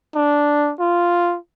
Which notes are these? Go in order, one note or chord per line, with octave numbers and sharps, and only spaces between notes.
D4
F4